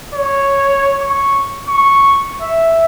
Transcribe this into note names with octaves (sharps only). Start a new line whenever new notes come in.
C#5
C#6
C#6
E5